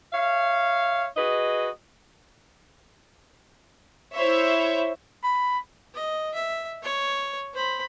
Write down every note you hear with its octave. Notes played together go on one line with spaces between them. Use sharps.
C#5 E5 F5
F#4 G#4 B4 D#5
E4 C5 C#5 E5
B5
D#5
E5
C#5
C5 B5